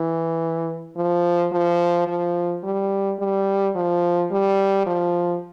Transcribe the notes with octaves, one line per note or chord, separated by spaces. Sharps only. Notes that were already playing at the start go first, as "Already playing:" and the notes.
Already playing: E3
F3
F3
F3
G3
G3
F3
G3
F3